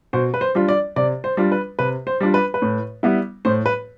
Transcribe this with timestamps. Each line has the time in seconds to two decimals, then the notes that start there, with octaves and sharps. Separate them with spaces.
0.13 B2 C5
0.34 B4
0.41 C5
0.55 G3 D4 F4
0.68 D5
0.96 C3 D5
1.24 C5
1.37 G3 D4 F4
1.52 B4
1.79 C3 B4
2.07 C5
2.21 G3 D4 F4
2.34 B4
2.54 B4
2.62 A2
3.03 G3 B3 E4
3.45 A2 C5
3.66 B4